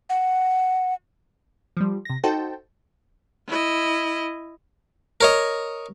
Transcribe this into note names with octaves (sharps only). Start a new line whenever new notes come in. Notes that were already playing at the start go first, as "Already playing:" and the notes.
F#5
F3 G3
C3 A#6
D#4 F#4 A4 C5 G5 A5
E4 D#5
A#4 C#5 D#5